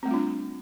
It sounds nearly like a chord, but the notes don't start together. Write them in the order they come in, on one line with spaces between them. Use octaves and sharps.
C4 A3 G3 F4 D4